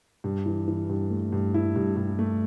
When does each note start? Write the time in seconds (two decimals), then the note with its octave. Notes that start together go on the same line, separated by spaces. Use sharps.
0.24 G2
0.46 E3
0.68 E3
0.89 G2
1.10 A3
1.32 G2
1.54 E4
1.76 G2
1.96 G2
2.19 A3